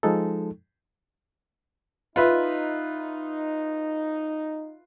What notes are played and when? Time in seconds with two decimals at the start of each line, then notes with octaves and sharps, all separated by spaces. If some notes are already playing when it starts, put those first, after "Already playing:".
0.03 F3 G#3 D#4 A4
2.16 D#4 F4 B4 E5